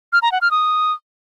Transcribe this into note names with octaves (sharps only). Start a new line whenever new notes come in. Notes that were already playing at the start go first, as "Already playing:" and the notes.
F6
A#5
F#5
F6
D#6